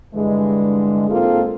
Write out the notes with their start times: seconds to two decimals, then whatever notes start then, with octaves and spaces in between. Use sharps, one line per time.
0.15 G2 D3 E3 G#3
1.10 G#2 A#3 C4 F4 A4